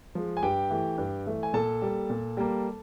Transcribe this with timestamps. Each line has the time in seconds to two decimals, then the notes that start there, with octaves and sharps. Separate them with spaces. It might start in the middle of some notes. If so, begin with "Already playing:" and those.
0.15 F3 G#3
0.37 G#5
0.43 G2 G4 G5
0.71 E3 A3
0.98 G2
1.26 E3 A3
1.43 G#5
1.54 A#2 A4 A5
1.82 G3 A#3
2.10 A#2
2.37 G3 A#3